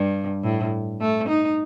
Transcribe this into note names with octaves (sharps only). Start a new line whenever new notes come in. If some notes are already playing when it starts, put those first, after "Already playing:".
Already playing: G2
A2
A3
D#4